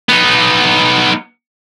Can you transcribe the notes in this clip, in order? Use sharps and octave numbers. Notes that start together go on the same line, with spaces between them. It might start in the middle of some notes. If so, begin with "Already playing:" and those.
B3 D#4